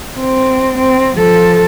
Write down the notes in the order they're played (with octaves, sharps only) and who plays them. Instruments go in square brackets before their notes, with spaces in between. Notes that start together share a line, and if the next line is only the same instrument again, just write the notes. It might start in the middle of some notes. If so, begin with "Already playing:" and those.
[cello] C4
C4
F3 A4